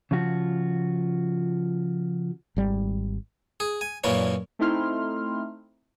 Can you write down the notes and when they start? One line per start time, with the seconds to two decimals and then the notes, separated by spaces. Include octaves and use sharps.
0.11 C#3 F3 F4 F#4
2.56 G#1 G3
3.60 G#4
3.81 G#5
4.04 F#2 A#2 E3 C#4 D4
4.59 A3 C4 D#4 E4 C6 F6